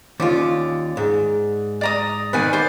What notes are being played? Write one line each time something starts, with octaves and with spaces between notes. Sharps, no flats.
D#2 C#4 F4 D5
G#2
D5 A#5 D#6
D#3 B3 B4 D5 G#5
C5 D5